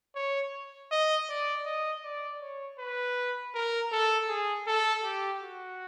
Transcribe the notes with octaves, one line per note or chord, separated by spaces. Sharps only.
C#5
D#5
D5
D#5
D5
C#5
B4
A#4
A4
G#4
A4
G4
F#4